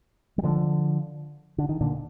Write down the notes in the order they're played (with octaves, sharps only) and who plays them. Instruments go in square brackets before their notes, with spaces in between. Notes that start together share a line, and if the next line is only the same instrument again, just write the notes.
[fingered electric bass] G3
D3 F3
D3
D#3
A#2 D3